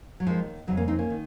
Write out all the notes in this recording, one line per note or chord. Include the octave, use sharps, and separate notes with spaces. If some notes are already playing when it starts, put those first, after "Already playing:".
F#3
D#2 D#3 F3 G#3
F2 C#3 F#3
A#3 C#4
C4 D#4
A#3 C#4
D#3